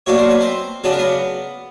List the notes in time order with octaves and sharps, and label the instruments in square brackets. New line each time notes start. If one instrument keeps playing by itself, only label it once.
[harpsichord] B2 F#3 A#3 D4 C#5
C5
B4
C4 C5
C#3 F#3 B3 D4 B4
A#4
B3 B4